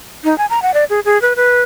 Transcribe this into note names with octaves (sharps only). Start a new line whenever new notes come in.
D#4
G#5
A#5
F#5
D5
G#4
G#4
B4
B4